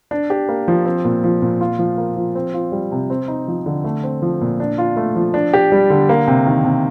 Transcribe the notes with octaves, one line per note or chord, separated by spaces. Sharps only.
D4
G4
A#3
F3
C4
A#2
F3
A#2
F4
F3
A#3
F3
C4
F4
G3
C3
C4
D#4
F3
D3
A3
C4
F3
A#2
D4
F4
A3
F3
D4
G4
G3
D3
A#3
C3
D#3
C3